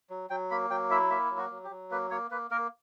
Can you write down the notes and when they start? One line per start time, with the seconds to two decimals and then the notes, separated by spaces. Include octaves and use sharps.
0.10 F#3
0.30 F#3 G5
0.51 A#3 B5
0.70 F#3 G5
0.90 E4 E5
1.10 A#3 E5
1.30 F#3
1.37 F#4
1.50 F#3
1.64 G4
1.70 F#3
1.91 A#3 B4
2.11 A#3 C#5
2.31 A#3 B4
2.51 A#3 A#4